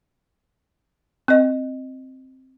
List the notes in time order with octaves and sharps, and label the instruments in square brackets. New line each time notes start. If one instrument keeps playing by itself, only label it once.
[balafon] C4 D#5